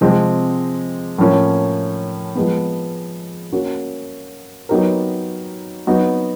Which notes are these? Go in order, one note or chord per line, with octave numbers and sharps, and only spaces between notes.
C3 F3 G#3 C4
A2 F3 A#3 C#4
F3 G#3 B3
A#3 C#4 F#4
F#3 B3 D#4 G4 A#4
F#3 B3 D#4 F#4